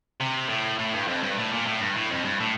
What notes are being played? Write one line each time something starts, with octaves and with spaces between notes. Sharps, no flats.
C3
A2
A2
G2
F2
G2
A2
A#2
A2
G2
A2
F2
G2
A2